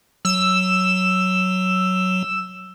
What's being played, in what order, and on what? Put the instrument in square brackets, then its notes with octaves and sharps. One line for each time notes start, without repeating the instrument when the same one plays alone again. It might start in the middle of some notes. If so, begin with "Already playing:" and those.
[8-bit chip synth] F#3 [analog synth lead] E6